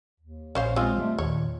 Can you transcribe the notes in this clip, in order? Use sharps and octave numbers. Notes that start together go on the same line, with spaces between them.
D#2
A#1 C#4 C5 F5
G#3 C4 F4 D#5 G#5
G3 A3
D#2 A#2 C#5